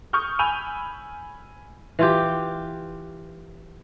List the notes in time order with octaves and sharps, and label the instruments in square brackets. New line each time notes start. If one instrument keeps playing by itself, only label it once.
[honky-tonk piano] C#6 D#6 F6 G6
G#5 B5 E6 G6 D#7 F7
[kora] E3 F4 G4